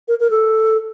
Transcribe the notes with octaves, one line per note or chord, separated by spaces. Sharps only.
A#4
A#4
A4